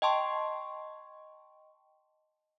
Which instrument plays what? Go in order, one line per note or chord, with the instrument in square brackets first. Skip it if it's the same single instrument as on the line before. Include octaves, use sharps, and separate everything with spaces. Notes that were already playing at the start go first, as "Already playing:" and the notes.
[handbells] D#5 G5 A5 C6 C#6